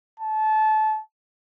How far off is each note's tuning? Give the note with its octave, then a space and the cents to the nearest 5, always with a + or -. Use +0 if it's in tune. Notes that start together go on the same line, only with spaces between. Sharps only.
A5 -25